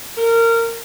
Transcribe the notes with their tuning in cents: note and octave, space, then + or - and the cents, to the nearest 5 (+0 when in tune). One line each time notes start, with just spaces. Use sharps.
A#4 -20